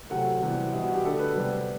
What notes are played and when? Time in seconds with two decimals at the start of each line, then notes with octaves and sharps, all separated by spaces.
0.10 C3 F#3 A3 F#5
0.41 C3 E3 G3 B3
0.73 B2 G3 B3 E5
0.83 F#4
0.94 G4
1.04 D3 A3 A4
1.19 B4
1.35 C3 G3 B3